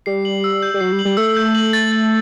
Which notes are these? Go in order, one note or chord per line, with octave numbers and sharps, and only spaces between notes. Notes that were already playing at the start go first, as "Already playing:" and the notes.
G3 C7
F#7
E6
G6
G3
F#3 C7
G3
F#7
G3
A3 E6
G6
F#7
A6
A6